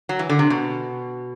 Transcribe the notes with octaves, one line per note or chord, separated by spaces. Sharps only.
F#3
E3
D3
C3
B2